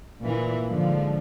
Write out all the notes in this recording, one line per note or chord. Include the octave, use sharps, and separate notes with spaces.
A#2 E3
G#2 D3 F3